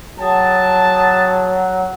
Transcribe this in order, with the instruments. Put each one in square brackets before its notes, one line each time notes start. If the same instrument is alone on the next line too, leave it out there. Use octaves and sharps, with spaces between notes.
[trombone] F#3 [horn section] G#4 G5 A5